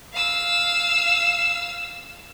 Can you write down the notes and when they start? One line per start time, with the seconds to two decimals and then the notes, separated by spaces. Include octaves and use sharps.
0.13 F5 E6